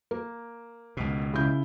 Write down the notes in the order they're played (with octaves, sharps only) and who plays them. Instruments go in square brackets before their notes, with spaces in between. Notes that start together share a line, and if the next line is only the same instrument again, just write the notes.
[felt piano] A#3
[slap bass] C#2 B2
[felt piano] C#3 E4 G6